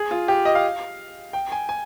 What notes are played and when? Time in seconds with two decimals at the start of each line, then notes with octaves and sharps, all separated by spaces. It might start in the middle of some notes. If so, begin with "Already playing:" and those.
Already playing: G#4
0.11 F4
0.28 G4
0.45 D#5
0.55 F5
1.33 G5
1.52 G#5
1.69 G#5